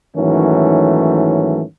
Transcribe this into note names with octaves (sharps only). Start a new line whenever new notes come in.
G#2 D#3 E3 F#3 A3 C#4